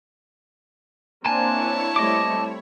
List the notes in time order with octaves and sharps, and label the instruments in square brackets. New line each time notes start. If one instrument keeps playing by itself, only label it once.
[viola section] A#3 C4 D4 [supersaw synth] E4 C#5 [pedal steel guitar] G#5 [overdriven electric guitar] A5
[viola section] G3 A3 C4 [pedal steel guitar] D#5 D6